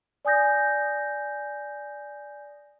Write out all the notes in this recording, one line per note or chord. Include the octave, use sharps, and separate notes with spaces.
D5 G#5 D#6 G6 A#6